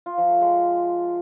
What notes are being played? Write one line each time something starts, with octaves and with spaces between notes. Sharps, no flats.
F4
F3
A3
G#3